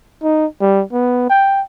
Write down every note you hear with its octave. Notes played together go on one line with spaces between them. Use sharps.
D#4
G3
B3
G5